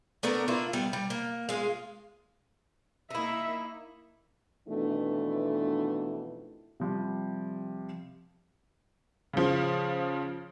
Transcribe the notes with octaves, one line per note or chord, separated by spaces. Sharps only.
A3 B3 D4 A#4
A#3 D4 E4 F4
G3 B3
G3
A#3
G#3 F4
A#3 D#4 E4 E5
F2 B2 D#3 E3 A3 D4
C3 F3 G3
C#3 F3